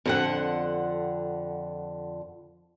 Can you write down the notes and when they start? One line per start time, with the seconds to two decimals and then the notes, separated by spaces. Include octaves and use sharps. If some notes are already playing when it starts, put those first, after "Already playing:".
0.06 F2 D3 F#5